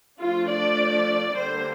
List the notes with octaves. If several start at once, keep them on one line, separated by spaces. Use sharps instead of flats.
F3 A3 D4 F4
D5
D3 G3 A#3 D4 C5